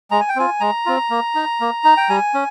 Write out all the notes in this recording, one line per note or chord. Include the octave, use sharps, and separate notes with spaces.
G#3 A#5
G#5
G5
C4 F4 G#5
G#3 A#5
C4 F4
A#3
D#4
A#3
D#4
G5
G3 G#5
C#4